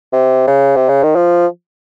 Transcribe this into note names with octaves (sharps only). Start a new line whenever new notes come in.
C3
C#3
C3
C#3
D#3
F3